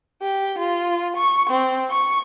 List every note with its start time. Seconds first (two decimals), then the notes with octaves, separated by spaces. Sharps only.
0.22 G4
0.58 F4
1.16 C#6
1.50 C4
1.91 C#6